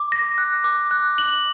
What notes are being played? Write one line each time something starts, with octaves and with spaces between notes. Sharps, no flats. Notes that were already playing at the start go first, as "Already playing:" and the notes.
Already playing: D6
A#6
F#6
D6
F#6
F#7